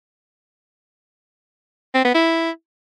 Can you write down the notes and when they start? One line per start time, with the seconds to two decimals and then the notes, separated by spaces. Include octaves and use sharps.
1.94 C4
2.04 B3
2.14 E4